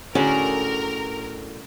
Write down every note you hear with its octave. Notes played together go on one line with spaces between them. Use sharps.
A2 D3 C#4 F#4 G#4 A#4